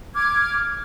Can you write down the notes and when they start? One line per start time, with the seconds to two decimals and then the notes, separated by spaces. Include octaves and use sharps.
0.14 D6 F6 G#6